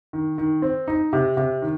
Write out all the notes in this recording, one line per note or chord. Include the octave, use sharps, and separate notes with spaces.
D#3
D#3
C4
D#4
C3
C3
D#3